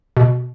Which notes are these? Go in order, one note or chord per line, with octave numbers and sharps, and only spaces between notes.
B2